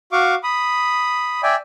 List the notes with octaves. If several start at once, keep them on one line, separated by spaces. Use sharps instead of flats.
F#4 F5 C#6 D6
B5 D#6
D5 E5 G5 G#5